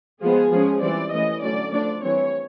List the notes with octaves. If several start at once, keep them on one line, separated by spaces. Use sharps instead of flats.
F3 G#3 B3 G#4
F3 G#3 C#4
E3 G3 C4 D5
E3 A3 C#4 D#5
D3 F#3 A3 C#4 D5
F3 A3 D4 D5
E3 G3 C4 C#5